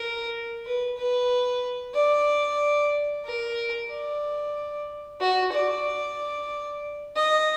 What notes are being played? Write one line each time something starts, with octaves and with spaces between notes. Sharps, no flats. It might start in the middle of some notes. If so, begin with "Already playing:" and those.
Already playing: A#4
B4
B4
D5
A#4
D5
F#4
D5
D#5